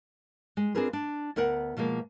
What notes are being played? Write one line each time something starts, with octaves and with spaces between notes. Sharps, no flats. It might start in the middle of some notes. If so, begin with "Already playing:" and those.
G#3
C4 D4 F4 G#4 A#4 B4
D4
D2 B3 A#4 F#5
B2 F3 G#3 A#3